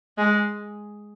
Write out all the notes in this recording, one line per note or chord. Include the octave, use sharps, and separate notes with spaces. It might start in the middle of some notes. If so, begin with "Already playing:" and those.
G#3